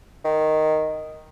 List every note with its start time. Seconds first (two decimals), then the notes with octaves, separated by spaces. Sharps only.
0.24 D#3